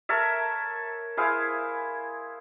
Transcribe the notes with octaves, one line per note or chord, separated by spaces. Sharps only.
A4 A#4 C#5 E5
E4 G#4 C5 F5